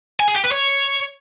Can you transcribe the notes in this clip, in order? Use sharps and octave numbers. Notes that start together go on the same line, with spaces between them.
G#5
G#4
G4
B4
C#5